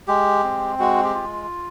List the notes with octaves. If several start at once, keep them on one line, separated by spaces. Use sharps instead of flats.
G#3 G4
C4
G#3 F#4
G4
F4